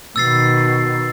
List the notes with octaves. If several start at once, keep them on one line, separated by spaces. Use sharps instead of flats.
B2 D#3 E6 A6 C7